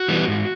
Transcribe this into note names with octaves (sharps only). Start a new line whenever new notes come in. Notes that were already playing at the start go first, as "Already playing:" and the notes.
Already playing: F#4
E3 G3 B3
G#2